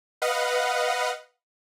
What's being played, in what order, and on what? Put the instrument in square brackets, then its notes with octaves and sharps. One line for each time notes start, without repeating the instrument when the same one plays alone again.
[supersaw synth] B4 D#5 F5 F#5